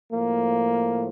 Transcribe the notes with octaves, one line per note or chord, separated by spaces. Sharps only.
A2 F3 A#3